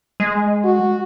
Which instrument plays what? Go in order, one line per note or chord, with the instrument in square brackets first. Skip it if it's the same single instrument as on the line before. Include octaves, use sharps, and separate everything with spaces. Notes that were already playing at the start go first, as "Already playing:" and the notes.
[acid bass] G#3
[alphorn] F#4